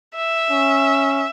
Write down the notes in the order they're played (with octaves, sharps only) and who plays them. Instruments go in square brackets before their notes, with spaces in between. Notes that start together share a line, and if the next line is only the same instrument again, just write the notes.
[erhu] E5
[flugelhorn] C#4